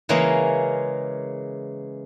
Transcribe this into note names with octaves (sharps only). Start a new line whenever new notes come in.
C#3 E3 G#3 A#3 C#4